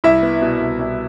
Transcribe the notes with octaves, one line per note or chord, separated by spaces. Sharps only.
C2 E4 E5
B3
B2
C2
C2